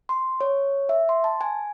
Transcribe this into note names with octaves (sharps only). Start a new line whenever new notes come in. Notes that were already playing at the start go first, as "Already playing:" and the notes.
C6
C#5
E5
C6
A5
G#5